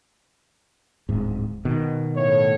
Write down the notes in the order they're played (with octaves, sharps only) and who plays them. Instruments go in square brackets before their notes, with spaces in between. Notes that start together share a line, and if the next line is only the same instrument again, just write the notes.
[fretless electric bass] D1 G#2
B2 D#3
[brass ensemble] A2 C#5